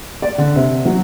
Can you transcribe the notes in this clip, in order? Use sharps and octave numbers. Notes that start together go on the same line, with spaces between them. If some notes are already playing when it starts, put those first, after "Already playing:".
D5
D3
C3
F#3